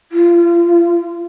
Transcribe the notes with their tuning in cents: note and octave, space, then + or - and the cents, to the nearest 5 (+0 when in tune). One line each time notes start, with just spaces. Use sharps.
F4 -30